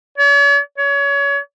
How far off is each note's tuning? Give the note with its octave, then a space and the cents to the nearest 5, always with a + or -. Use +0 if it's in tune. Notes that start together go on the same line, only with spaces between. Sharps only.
C#5 +45
C#5 +30